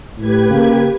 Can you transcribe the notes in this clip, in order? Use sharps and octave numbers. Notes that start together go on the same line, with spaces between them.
A2 G4 B4 G#6
C#3 A#3